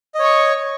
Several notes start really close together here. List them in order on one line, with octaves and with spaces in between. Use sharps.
D#5 C#5 C#6